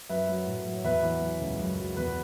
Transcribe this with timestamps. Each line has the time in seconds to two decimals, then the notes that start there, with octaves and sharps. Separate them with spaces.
0.09 F#2 B4 E5
0.29 F#3
0.47 A2
0.66 F#3
0.84 E2 B4 E5
1.03 E3
1.22 F#3
1.41 C#2
1.59 F#2
1.79 F#3
1.96 E2 B4